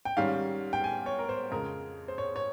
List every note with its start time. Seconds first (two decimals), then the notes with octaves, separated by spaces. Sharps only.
0.05 G5
0.17 G#2 D#3 G3 C#4 F5
0.73 G5
0.84 G#5
1.06 C#5
1.19 A#4
1.29 C5
1.51 F2 C#3 G#3 A#4
2.08 C5
2.18 C#5
2.36 C#5